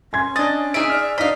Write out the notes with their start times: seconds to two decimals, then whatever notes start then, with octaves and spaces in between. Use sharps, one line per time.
0.13 C#4 G#5 C6 G#6
0.36 D4 D#5 A6
0.74 D#4 G#4 E5 D7
0.90 D5 F6
1.18 D4 D#4 D#5 F5 B6